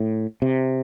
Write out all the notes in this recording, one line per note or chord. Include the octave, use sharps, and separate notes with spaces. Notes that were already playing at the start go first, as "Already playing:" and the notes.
Already playing: A2
C3